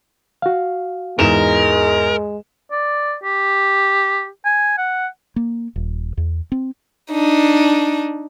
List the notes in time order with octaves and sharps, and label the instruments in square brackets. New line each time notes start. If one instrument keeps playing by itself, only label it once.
[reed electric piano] F#4 F5
[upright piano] E2 G#2 E7 [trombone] G#3 [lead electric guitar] A#4
[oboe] D5
G4
G#5
F#5
[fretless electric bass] A#3
D#1
E2
C4
[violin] D4 D#4